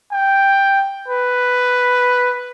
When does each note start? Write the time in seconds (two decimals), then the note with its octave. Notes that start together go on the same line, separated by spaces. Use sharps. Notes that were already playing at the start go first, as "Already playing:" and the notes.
0.12 G5
1.08 B4